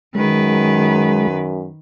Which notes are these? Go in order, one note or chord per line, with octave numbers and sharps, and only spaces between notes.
F#2 D#3 G#3 B4